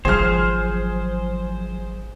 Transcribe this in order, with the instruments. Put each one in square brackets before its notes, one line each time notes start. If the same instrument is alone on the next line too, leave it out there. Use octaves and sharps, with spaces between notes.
[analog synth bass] G#1 [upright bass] F3 F#3 [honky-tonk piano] G#4 F6 [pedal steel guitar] C5